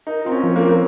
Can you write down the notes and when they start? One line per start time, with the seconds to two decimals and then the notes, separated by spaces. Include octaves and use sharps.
0.07 D#4 A#4
0.25 C4 F4
0.32 C#4
0.43 F3
0.56 A#3
0.61 C4 A#4
0.69 A#3